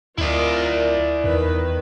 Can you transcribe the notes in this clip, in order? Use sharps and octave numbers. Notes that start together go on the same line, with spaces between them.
D2 E4 F4 A#4 D5 D#5
E2 D#3 B4